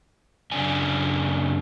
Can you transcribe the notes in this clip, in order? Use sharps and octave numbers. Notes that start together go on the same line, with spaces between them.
F#2 C#3 D4 G#5